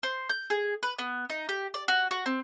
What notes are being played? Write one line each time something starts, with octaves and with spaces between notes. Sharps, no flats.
C5
G6
G#4
B4
B3
D#4
G4
D5
F#4
F#4
C4